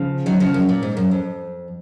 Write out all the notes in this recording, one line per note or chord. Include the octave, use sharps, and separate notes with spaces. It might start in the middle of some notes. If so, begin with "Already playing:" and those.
Already playing: C#3 F3
D#3 F#3
C#3 F3
F#2
A#2
G#2
F#2
F2